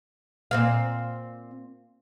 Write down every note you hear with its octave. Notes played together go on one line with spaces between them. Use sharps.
A#2 C4 F5